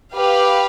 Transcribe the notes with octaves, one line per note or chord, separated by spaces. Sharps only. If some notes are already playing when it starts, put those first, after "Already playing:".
G4 B4 F5